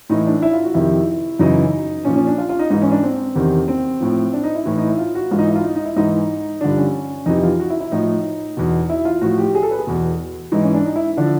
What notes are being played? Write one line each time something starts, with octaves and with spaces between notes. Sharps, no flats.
A2 E3 D#4
D4
E4
F4
F#4
F2 C3 D#3 E4
F#2 C#3 E3 D#4
A#2 F3 C#4
C#4
D4
F4
F4
D#4
G#2 E3 D#4
C#4
D4
C4
E2 C3 D#3
C4
A2 F3
D4
D#4
E4
A2 E3
D#4
E4
F4
F#4
G#2 E3 F4
D#4
E4
F4
D#4
D#4
E4
G#2 E3 D#4
G2 D3 F3 D4
C#4
F2 C3 E3 D#4
F4
F#4
E4
E4
A2 F3 D#4
E2 B2
E4
F4
A2 F3 F#4
G4
G#4
A4
B4
G#4
E2 B2
G#2 E3 D#4
C#4
D4
D#4
E4
D3 F3 D4